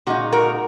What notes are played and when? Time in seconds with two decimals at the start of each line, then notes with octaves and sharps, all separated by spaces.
0.07 A#2 G#3 D#4 F#4
0.32 F#4 A#4